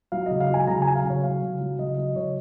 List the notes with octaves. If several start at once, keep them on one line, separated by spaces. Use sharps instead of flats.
F#3 F5
C#3 D#5
F5
F#3 G#5
C#3 A#5
F#3 G#5
F5
C#3 C#5
F#3 F5
C#3
F#3
C#3 D#5
F#3 D#5
C#3 C#5